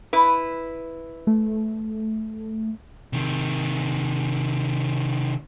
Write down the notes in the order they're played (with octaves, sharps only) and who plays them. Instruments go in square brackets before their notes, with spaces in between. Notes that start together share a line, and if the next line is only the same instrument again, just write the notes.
[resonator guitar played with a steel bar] E4 B4
[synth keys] A3
[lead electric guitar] C3 D#3